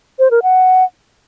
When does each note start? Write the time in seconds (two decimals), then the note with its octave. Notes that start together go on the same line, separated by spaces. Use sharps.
0.19 C5
0.31 A#4
0.43 F#5